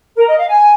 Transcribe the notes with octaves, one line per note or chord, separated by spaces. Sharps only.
A#4
D#5
F5
G#5